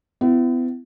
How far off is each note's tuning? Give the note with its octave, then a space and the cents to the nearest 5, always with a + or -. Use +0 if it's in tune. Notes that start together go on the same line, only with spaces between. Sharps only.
B3 +40 E4 +35